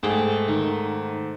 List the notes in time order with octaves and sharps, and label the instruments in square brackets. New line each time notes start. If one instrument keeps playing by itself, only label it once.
[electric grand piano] G#2 A3 [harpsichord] G#4 G5 A5
[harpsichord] D#3